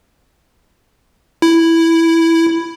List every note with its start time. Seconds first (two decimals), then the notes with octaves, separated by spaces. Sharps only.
1.42 E4